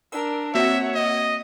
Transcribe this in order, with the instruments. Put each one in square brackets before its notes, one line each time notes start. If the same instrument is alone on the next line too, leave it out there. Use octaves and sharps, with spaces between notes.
[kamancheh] D4 A#4 [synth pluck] E6
[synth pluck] A#3 C4 F#4 [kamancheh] C#5 F#5 [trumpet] E5
[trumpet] D#5